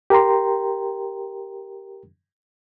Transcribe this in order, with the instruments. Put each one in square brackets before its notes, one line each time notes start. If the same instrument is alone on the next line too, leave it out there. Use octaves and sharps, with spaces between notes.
[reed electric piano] G4 A#4 G5 A#5 C6